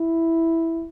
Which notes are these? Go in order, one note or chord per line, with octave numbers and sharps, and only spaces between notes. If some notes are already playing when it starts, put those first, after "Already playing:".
Already playing: E4